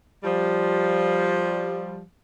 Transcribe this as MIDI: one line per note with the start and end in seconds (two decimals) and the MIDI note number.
0.23 2.03 53
0.23 2.03 55